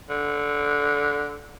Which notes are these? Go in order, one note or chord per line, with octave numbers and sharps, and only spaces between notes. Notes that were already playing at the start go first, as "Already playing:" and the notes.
D3